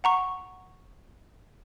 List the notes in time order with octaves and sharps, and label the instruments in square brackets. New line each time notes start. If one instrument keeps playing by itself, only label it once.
[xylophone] F#5 A#5 C#6